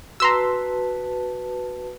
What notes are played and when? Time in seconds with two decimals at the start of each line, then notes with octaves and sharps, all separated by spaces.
0.20 F#4 B4 A5 A#5 C6 E6